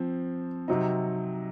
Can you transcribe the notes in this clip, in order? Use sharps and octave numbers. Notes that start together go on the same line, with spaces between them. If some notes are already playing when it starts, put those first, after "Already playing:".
Already playing: F3 C4
C3 F#3 C4 D#4